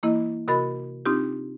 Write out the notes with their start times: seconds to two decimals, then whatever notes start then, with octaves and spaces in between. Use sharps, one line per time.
0.03 E3 A#3 E4 D#5
0.48 C3 F#4 A#4 D#5 B5 A6
1.06 C4 D4 D#4 F4 G4